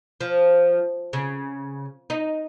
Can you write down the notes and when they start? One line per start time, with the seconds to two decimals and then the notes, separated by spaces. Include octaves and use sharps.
0.21 F3
1.13 C#3
2.10 D#4